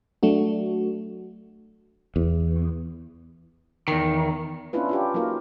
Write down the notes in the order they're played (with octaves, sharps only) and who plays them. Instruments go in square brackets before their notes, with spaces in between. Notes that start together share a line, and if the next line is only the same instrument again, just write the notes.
[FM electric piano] F#3 A3 D4 F#4
[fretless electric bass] E2
[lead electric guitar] E2 D#3
[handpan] B3 C#4 D4 E4 F4 B4
D4 F4 G4
F#3 A#3 D#4 F4 A#4